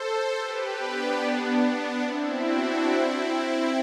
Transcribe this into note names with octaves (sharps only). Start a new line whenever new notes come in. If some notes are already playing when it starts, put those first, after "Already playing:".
Already playing: A4 C5
G4 B4
B3 D4
C4 E4
D4 F#4
C4 E4
C4 E4